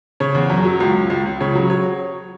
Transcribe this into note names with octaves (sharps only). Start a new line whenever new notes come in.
C#3 C#5
E2
F#2
F#3
C#2
C#2
C#2
C#2
C#3 C#5
F#3
F#3 C#5